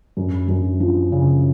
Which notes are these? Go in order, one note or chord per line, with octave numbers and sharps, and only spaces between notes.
F#2
F#2
F3
C#3